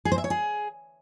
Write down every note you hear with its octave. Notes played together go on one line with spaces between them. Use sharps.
G#4
C5
E5
C#5
G#4